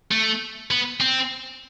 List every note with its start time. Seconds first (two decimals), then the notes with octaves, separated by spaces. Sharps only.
0.11 A3
0.71 B3
1.01 C4